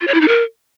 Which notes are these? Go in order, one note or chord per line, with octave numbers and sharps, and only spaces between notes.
F4
C#5
E4
D#4
A#4